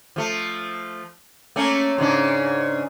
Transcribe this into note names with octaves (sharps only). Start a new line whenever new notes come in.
F3 A3
A3 A#3 C#4
G#2 C#3 D4